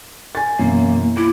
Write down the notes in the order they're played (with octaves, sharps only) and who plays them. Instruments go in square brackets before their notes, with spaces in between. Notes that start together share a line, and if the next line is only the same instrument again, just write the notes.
[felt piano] G#5 A6
[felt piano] F#2 B2 E3 [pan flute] A#3
[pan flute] E4 [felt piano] D6